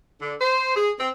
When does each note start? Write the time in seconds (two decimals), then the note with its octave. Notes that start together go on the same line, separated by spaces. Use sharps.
0.21 D3
0.41 C5
0.76 G#4
0.99 C4